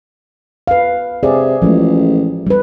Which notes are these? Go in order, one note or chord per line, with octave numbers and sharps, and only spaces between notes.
B4 F5
C3 G#4 D5
A1 F3 G#3 A3
G3 B4